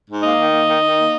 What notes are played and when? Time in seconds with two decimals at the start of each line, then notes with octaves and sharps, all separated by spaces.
0.09 G#2
0.23 A#3 D#4
0.38 D#3
0.52 A#3
0.67 D#3
0.82 D#3
0.97 A#3